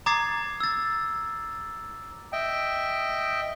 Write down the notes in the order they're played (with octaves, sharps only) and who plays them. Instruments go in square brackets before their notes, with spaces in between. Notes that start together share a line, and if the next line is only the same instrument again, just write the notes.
[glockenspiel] A#5 D6 D#6 G#6 A6 C7
E6 A6
[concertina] D#5 E5 G5